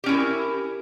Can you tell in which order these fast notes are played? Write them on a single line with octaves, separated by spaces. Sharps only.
G4 C#4 E4 A#4